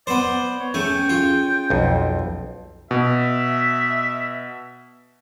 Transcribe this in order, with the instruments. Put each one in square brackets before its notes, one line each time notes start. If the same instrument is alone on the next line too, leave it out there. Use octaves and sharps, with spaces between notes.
[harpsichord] B3 C5 [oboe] D5
[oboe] C#5
[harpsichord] A3 [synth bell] C#4 G#4 [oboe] G5
[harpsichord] F4
[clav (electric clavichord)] B1 F2
[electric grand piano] B2 [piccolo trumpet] E5